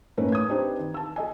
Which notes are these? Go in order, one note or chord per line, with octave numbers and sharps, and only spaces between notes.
A2 A3 C#4 D#4 A#4 B4
D#6 G#6
C4 D4 D#4 G4 B4 C5
D#3
A5 E6
A4 D#5 G#5